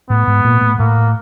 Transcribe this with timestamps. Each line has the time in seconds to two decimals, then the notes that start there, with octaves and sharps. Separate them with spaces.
0.10 A2 A3 B3
0.27 G#2 G#3
0.44 A#2 A#3
0.61 A2 A3
0.78 A2 A3 A#3